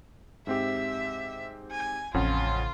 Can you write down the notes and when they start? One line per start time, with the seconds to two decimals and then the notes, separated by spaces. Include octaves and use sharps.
0.47 G#2 C4 G4 E5
1.71 G#5
2.14 A1 F2 C#3 C#4 F4 F#5